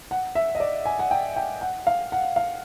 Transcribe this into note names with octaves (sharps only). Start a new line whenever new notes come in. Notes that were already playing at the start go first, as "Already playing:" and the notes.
F#5
E5
D#5
D5
G#5
F#5
G5
G5
F#5
F5
F#5
F5